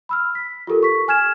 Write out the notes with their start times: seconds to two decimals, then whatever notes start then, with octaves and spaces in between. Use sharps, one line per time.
0.09 B5 E6 F6
0.35 B6
0.67 F4 G4 A4 A#4
0.83 C#6 B6
1.08 G#5 F6 G#6 E7